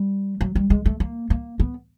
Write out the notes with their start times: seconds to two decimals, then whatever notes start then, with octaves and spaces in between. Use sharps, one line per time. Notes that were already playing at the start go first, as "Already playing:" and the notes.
Already playing: G3
0.41 F#3
0.55 G3
0.70 G#3
0.86 A3
1.00 A#3
1.30 A#3
1.60 B3